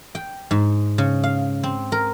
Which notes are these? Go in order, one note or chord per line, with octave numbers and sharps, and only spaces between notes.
G5
G#2
C#3
F5
C4
A#4